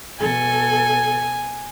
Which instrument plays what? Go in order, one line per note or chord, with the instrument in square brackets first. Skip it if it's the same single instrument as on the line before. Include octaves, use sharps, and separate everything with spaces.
[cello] B2 A4 [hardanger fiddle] G#5